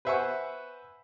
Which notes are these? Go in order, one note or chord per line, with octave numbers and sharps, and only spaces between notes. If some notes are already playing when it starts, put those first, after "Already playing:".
B4 C5 E5 F#5 G#5 C#6